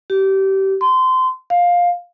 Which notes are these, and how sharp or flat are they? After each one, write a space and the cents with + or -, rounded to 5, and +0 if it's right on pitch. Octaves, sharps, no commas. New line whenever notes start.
G4 -25
C6 -25
F5 +10